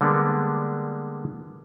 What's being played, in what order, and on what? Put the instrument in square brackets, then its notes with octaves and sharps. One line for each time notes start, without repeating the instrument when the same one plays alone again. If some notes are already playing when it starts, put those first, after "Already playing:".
[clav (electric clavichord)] D3 G3 G#3 A#3 B3 D4